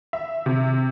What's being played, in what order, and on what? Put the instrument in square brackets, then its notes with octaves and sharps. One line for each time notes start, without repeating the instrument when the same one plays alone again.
[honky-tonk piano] E5
C3